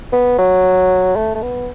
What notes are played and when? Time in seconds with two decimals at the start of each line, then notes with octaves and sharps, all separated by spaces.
0.13 B3
0.39 F#3
1.16 A3
1.35 A3
1.42 B3